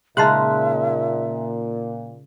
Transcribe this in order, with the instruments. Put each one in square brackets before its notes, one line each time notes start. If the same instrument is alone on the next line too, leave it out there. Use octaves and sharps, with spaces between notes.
[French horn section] A#2 [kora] C#3 G#3 D#4 [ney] E5 [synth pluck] A5 C6 F#6